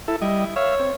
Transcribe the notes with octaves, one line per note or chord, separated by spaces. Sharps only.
E4 A4
G3 E4 D#5
C#5 E5 F5
C4